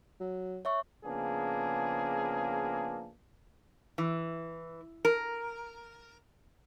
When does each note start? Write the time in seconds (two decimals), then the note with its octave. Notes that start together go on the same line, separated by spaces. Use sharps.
0.20 F#3
0.65 C#5 E5 C#6
1.03 C#3 F3 A#3 B3 D4 G#4
3.98 E3
5.05 A#4